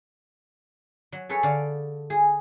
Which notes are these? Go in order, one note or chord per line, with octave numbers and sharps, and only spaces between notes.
F#3
G#4 A4 B4 C#5
D3 D5 F5
G#4